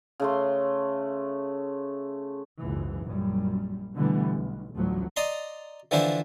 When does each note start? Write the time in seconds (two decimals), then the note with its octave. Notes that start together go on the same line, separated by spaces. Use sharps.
0.20 C#3 A3 C6
2.60 F#1 C#2 G#2 E3
3.07 A#1 F#2 G3
3.96 B2 D3 E3 G3 A3 B3
4.32 B1
4.75 A1 D2 F3 F#3
5.16 D5 D#5 A#5 C6
5.91 D3 E3 F3 D4 E4 C5